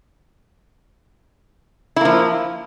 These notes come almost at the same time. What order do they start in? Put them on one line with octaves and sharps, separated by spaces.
E4 A#3 F3